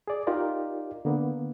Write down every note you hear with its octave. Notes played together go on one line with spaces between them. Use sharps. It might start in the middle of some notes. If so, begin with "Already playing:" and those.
G#4 D5
D#4 F4 G4 A#4 D5
D3 A#3 B3